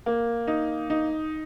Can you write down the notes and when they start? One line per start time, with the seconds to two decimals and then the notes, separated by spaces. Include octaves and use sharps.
0.06 A#3
0.47 D#4
0.90 D#4